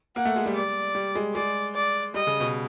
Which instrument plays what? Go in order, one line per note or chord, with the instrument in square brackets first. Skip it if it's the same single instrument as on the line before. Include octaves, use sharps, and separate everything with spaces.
[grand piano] A#3 [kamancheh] F#5
[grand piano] A3
G#3
G3
[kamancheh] D5
[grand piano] G3
G#3
[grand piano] G#3 [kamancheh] D5
[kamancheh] D5
[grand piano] G3 [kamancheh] D#5
[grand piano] C#3
B2